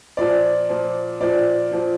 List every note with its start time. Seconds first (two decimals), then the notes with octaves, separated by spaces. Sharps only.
0.17 A#2 F3 D5
0.70 A#2 F3
1.20 A#2 F3 D5
1.72 A#2 F3